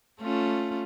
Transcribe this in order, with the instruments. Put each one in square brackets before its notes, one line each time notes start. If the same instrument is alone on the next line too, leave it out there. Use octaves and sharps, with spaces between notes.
[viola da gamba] A3 C#4 F4